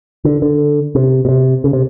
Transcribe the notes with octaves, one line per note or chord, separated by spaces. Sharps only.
D3
D3
C3
B2
C3
C#3
C3